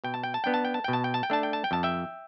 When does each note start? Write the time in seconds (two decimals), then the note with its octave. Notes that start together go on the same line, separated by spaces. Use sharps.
0.04 B2 G5
0.14 A5
0.23 G5
0.34 A5
0.44 B3 D4 G5
0.54 A5
0.65 G5
0.74 A5
0.84 B2 G5
0.93 A5
1.04 G5
1.14 A5
1.23 G5
1.30 A3 D4 A5
1.43 G5
1.53 A5
1.64 G5
1.71 F2 A5
1.83 E5 G5